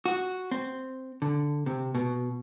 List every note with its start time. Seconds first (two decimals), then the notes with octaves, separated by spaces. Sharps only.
0.06 F#4
0.51 C4
1.22 D3
1.66 C3
1.95 B2